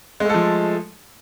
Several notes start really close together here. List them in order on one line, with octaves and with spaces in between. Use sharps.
G#3 A3 A4 F3